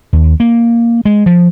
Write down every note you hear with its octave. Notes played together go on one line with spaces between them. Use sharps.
D#2
A#3
G#3
F3